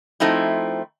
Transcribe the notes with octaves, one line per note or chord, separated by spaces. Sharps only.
F3 A3 C4 D#4 E4